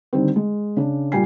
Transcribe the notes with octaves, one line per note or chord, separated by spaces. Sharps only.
D3 D#3 G3 C4
G#3
C#3 D4
A#2 G3 G5 G#5 C7